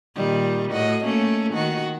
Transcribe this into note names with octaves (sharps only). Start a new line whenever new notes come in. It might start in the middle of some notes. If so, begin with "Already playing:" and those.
A#2 D#3 G3
A2 F#4 D#5
A3 A#3 C#4
D#3 F#4